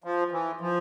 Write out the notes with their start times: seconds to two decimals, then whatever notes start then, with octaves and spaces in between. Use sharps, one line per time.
0.04 F3
0.32 E3
0.61 F3